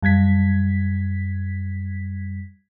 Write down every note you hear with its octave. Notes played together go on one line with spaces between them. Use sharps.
F#2 G3 G#6 B6